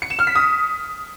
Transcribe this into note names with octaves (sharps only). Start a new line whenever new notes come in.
C#7
E7
F6
B6
D#6